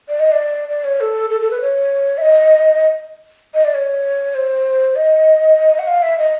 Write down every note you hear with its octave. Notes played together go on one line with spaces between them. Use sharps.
D5
D#5
D5
D5
C#5
A4
A4
A4
B4
C#5
E5
D#5
D#5
D5
C#5
C5
D#5
F#5
F5
E5
D#5